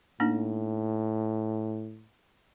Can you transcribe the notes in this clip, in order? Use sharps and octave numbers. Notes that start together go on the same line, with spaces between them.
A2 A#3 D4 D#4